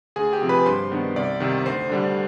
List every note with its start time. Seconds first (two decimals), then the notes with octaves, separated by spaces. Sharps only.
0.16 D2 G#4 G#5
0.33 G4 G5
0.42 C3 F3 C4
0.49 B4 B5
0.66 G2 C5 C6
0.91 D#3 B3 D4
1.16 C2 D5
1.40 C3 D#3
1.66 D2 C5
1.90 D3 G3 D4